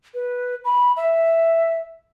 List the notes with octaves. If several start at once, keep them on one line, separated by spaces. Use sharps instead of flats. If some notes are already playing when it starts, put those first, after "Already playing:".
B4
B5
E5